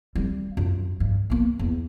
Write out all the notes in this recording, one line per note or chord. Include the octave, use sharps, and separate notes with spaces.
G3 C4
F#2 F4
G2
A#3 B3
E2